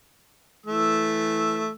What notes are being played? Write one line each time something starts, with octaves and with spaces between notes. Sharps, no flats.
E3 A3 E6